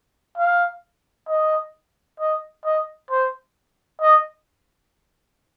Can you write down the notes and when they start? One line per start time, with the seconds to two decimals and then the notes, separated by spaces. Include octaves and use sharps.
0.37 F5
1.28 D#5
2.20 D#5
2.65 D#5
3.11 C5
4.01 D#5